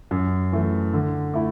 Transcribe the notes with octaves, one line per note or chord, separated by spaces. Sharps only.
F#2
E3 A3
D3
A3 E4